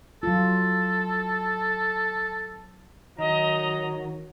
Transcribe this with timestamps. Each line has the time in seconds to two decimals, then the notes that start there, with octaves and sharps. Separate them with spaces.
0.23 F#3 F4 A4
3.18 D#3 F#3 D#5 A#5